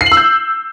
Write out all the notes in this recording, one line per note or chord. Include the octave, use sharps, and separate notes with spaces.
C7
F#7
E6
G6